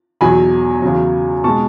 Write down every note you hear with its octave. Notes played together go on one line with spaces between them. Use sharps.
E2 B2 F#3 G#5 B5
E2 C#3 F#3
B2 G#3 A5 C#6